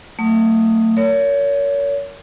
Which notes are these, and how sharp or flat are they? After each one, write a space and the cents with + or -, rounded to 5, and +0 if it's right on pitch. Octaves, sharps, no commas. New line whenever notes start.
F#3 +10 A3 +35 D#6 +0
A#4 -15 C#5 +30